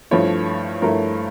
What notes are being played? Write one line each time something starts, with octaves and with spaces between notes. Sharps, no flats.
G2 F3 A3 E4 C#5
G2 F3 A3 E4 A#4